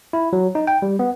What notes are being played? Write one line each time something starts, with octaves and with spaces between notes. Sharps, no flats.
E4
F#3
D#4
G5
G3
B3